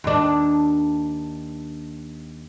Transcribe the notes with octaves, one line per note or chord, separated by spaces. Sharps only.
D#2 D4